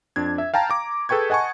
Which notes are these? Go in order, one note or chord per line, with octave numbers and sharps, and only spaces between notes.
F2 D4 G#6
E5
F5 G5 A5 A#5
A#5 D6
G#4 A4 B4 G5 C#6 G#6
D#5 F#5 G#5 A5 C#6